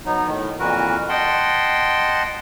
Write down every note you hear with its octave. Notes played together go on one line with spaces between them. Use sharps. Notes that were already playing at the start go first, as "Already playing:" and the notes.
F#3 B3 D#4
A2 D#3
F2 A#2 E3 F#4 A#4 B4
D#5 F#5 G5 A5 C6